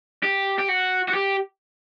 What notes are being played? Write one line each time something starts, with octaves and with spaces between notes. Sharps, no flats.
G4
G4
F#4
F#4
G4